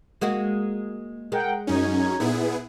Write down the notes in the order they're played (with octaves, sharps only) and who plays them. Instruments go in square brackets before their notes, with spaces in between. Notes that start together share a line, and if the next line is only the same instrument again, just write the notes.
[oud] G#3 A#3 F#4
[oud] G#3 [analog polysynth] A#4 F#5 G5
[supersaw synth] F#2 C#4 [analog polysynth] D#4 G#6
[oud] A#2 [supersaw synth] B3 E4 G#4